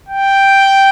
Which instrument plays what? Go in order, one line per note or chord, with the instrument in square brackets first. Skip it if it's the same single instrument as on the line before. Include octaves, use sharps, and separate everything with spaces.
[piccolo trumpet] G5